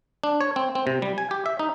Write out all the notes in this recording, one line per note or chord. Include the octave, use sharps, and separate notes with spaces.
D4
C#5
C4
C4
C3
G3
G#5
G4
E5
D#4